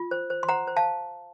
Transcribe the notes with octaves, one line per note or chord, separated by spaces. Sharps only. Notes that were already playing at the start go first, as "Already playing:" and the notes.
Already playing: F4
C5
C5
C6
C5 F#5 A#5
C5
F5 A5